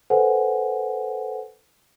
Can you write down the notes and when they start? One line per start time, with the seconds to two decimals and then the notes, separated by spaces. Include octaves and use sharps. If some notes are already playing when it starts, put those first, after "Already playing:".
0.10 A4 B4 C5 F#5 G#5